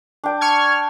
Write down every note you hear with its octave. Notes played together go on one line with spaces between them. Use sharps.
D4 G5
C#6 F6 G#6